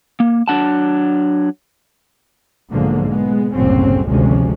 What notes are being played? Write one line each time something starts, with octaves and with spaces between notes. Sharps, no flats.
A#3
F#3 D4 F#5 A5
B1 G#2 D3 F3 A#3
G#3 B3
F#1 C2 A2 F#3 C4 C#4
G#1 D2 C3 F3 G#3 C#4